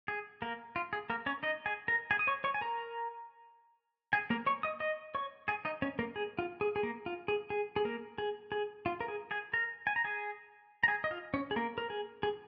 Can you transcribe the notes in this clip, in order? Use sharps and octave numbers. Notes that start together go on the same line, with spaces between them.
G#4
A#3 A#4
F4
G#4
A#3 A#4
C#4 C#5
D#4 D#5
G#4 G#5
A#4 A#5
G#4 G#5
D#6
C#5 C#6
C#5 C#6
G#5
A#4 A#5
G#4 G#5
A#3 A#4
C#5 C#6
D#5 D#6
D#5 D#6
C#5 C#6
G#4 G#5
D#4 D#5
C#4 C#5
A#3 A#4
G#4
F4
G#4
G#4
A#3 A#4
F4
G#4
G#4
G#4
A#3 A#4
G#4
G#4
F4
A#4
G#4
G#4 G#5
A#4 A#5
G#5
A#5
G#4 G#5
A#5
G#4 G#5
D#5
F4 F5
C#4 C#5
G#4
A#3 A#4
A#4
G#4
G#4